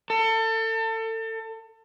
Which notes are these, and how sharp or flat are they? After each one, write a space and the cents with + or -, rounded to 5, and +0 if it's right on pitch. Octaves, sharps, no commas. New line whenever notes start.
A4 +30